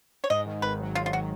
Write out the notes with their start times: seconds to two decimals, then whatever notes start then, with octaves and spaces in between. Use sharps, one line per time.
0.24 C#5
0.30 G#2 D#5
0.46 D#3
0.62 G#1 B4
0.80 F#3
0.95 G#2 F4
1.06 F4
1.12 D#3 F#4